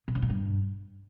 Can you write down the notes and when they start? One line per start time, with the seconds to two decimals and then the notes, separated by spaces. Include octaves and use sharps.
0.08 C3
0.15 C#3
0.22 A#2
0.30 G2